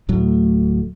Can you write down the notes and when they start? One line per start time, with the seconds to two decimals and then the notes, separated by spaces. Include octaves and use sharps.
0.09 D1 A2 F#3 A3